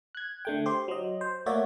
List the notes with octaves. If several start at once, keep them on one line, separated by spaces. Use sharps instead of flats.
F#6 G#6
D3 A3 G5
G4 C5 C6
F#3 D#5
C5
A3 A#3 F#4 C#5 D5 E5